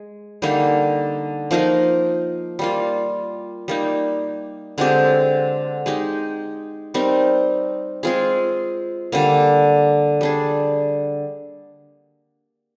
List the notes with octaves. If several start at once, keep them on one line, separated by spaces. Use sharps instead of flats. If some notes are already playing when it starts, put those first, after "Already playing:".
Already playing: G#3
D3 G3 A#3 D#4
F3 A#3 D#4 A#4
G3 A#3 F4
G3 A#3 D#4
D3 G#3 C4 G4
G#3 D#4 G4
G3 C4 D#4 A#4
G#3 C4 F4 G#4
D3 G3 A#3
G3 D4 G#4